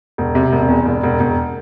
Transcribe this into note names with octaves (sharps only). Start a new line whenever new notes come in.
E1
C3
E1
E2
E1
E1
E1